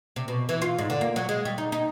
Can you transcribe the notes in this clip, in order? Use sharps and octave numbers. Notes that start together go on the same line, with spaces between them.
C3
B2
E3
F4
G#2
D3
A#3
F#3
G#3
G3
D#4
D#4